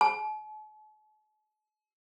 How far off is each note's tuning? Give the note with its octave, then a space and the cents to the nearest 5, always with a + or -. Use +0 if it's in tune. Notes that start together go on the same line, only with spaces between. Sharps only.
A5 -45